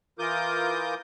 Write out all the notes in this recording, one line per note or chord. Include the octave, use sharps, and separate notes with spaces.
E3 F4 A#4 D6 D#6 G6